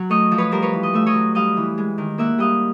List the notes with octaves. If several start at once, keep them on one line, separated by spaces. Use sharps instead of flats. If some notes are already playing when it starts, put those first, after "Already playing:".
Already playing: F#3
A3 C#5 D#5
F3
B4 C#5
G3 A#4 C5
B4 C#5
E3
D#5
A3 E5
C#5 D#5
F#3
G3 D#5 F5
E3
G#3
D#3
A#3 E5 F#5
G3 D#5 F5